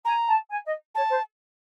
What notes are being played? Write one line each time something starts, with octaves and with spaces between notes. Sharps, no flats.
G#5 A#5
A5
G#5
D#5
C#5 A5
C5